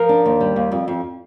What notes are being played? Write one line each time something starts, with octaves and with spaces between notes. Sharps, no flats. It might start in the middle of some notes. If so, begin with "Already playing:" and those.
Already playing: F3 A#4
D4
D#2
G3
D#2
F2
F2